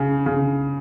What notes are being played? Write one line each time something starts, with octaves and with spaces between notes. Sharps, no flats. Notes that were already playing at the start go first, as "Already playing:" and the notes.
Already playing: C#3
C#3